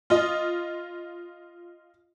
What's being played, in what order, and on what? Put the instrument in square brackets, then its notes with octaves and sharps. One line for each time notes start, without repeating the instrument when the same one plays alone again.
[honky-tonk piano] F4 D#5